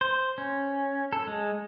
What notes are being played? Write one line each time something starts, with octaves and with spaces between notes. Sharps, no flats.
C5
C#4
A4
G#3